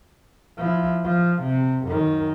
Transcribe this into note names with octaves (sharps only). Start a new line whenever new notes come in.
F3 E4
F3
C3
F#2 D#3